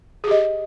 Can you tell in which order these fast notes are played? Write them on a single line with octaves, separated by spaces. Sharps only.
G#4 G4 D#5